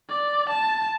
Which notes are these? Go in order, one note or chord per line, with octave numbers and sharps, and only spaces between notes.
D5
A5